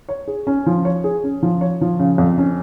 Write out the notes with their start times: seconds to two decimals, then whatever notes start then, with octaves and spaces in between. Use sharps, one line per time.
0.09 C#5
0.28 G#4
0.47 C#4
0.66 F3
0.85 C#5
1.04 G#4
1.24 C#4
1.43 F3
1.61 C#5
1.81 F3
1.99 C#3
2.18 F2
2.38 C#4